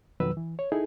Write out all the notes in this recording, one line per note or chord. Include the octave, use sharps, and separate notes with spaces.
F2 B2 D#3 F#3 B4 E6
E3
C#5
D#4 E4 G#4 A4